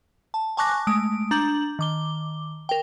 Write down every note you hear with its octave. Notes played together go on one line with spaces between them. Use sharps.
A5
G#5 A5 C#6 D6 F#6 A#6
G#3 A3 D#6 D7
D4 A#5 G6 F#7
D#3 D6 G7
A#4 G5